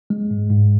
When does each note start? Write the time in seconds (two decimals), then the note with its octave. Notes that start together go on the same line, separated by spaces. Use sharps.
0.10 G#3
0.31 G#2
0.50 G#2